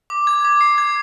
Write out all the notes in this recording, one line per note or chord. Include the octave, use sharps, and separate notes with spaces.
D6
G#6
D6
C7
G#6